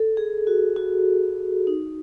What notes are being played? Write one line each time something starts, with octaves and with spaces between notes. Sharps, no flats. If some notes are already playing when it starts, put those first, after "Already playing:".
Already playing: A4
G#4
F#4
F#4
D#4